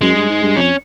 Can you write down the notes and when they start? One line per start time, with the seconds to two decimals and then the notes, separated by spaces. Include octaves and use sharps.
0.01 F#2 G#3
0.15 G2
0.29 G#2
0.43 G2
0.56 F2 C#4